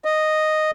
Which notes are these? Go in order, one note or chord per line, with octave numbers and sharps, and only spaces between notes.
D#5